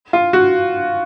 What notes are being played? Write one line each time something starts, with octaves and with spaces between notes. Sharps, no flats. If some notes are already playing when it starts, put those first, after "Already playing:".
F4
F#4